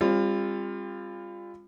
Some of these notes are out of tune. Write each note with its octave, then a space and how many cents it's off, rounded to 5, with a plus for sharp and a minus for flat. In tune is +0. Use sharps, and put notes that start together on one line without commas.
G3 +35 C4 +25 F4 +0